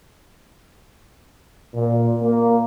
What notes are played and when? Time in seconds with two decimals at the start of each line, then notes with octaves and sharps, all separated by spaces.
1.74 A#2
2.20 A#3